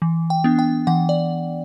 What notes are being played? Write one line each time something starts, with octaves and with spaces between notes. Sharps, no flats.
E3
G5
B3 D4
G5
E3 F#5
D5